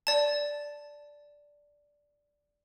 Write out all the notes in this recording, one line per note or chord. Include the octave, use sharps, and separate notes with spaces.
D5 A5